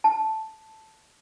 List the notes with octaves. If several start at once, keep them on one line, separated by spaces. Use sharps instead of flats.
A5